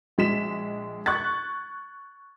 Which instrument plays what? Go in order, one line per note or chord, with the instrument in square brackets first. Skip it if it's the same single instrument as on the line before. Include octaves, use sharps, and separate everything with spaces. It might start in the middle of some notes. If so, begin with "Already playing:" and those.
[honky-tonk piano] A#1 G#3 B6 E7
C#6 F#6 G#6 A6